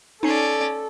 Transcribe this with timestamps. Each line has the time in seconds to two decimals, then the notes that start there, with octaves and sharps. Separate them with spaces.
0.23 C#4 D#4 A4 D5 C7